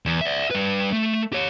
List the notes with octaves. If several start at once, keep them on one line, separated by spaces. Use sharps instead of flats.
E2
D5 E5
G3 B4
A3
G4 C#5